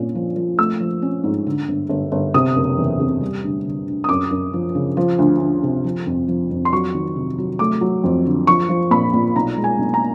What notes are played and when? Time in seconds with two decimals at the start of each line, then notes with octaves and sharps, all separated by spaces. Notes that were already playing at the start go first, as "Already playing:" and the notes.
Already playing: A#2 C#4
0.15 F3
0.36 F3
0.58 A3 E6
0.80 F3
1.02 C#4
1.24 G#2
1.47 D3
1.68 G1
1.89 G1
2.12 G1
2.34 C3 D#6
2.55 F#1
2.78 E2
3.00 C3
3.21 G3
3.43 D2
3.65 D3
3.87 D2
4.04 D#6
4.09 F#2 D6
4.31 F#2
4.53 F3
4.75 C#3
4.97 F3
5.18 D2
5.40 D2
5.63 C3
5.84 F3
6.06 F2
6.28 F3
6.50 F2
6.65 C6
6.73 F#3 C#6
6.94 D#3
7.16 C3
7.38 F#3
7.59 A3 D6
7.81 F#3
8.04 F2
8.25 D3
8.47 F3 C#6
8.69 F3
8.91 A#2 B5
9.14 A#2
9.36 B1 A#5
9.57 G#3
9.64 G#5
9.79 B1
9.94 A#5